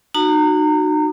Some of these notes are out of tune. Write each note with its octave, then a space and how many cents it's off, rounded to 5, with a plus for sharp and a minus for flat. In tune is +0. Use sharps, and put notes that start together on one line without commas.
D#4 -35 F#4 -5 A#5 -30